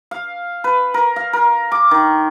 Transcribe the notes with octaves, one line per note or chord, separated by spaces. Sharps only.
F5
B4
A#4
F5
A#4
D6
D#3